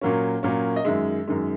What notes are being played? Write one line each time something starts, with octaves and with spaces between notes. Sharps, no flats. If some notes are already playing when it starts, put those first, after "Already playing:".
A#2 F#3 A#3 C#4
A#2 F#3 A#3 C#4
D#5
F#2 D#3 G#3 E5
F#2 D#3 G#3